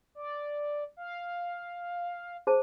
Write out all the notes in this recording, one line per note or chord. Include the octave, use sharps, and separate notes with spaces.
D5
F5
G#4 C5 A5